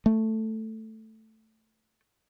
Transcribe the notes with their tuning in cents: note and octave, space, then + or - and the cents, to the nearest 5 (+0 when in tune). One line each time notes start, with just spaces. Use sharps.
A3 +5